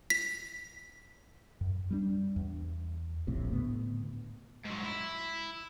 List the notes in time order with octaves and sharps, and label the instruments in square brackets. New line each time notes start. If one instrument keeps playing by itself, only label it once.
[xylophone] B6
[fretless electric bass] F#2
G3 A#3 D4
E2
D1 A#1 A2 C3
A2 D3 B3
[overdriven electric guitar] G#2 F#3
E4